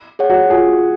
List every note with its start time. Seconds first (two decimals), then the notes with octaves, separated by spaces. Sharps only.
0.19 G#4 C#5 F#5
0.30 F#4
0.50 F4 G#4